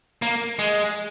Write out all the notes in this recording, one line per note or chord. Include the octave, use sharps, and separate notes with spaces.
A#3
G#3